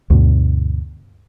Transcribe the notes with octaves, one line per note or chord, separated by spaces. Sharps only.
D2 G2 B2